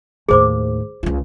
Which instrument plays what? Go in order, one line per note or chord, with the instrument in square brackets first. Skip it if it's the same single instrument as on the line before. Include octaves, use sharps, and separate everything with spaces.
[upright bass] D#2 A2 [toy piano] G#4 C5 D6
[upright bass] C#2 F4